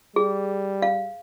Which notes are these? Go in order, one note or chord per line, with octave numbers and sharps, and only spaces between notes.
G3 G#4
F5